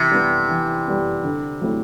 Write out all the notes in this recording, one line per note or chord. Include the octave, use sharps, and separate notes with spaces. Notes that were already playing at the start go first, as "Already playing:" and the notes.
Already playing: C3 E3
G3 B3
E3
G3 B3
D3
F#3 A3 C4 E4